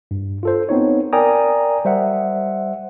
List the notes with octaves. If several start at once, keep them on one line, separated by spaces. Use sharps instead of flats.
G2
F4 A4 C5
B3 C4 D#4 C#5
A#4 D5 G5 G#5 A#5 D#6
G3 C5 E5 F#5